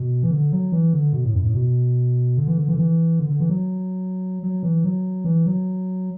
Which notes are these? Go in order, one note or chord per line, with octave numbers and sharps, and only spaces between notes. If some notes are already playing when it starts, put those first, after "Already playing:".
Already playing: B2
E3
D3
F#3
E3
D3
B2
A2
F#2
A2
B2
D3
E3
D3
E3
D3
E3
D3
D3
E3
F#3
F#3
E3
F#3
E3
F#3